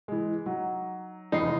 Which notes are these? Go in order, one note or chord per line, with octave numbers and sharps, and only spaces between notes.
E3 G#3
F#3 D#4
F1 E2 D#4 C7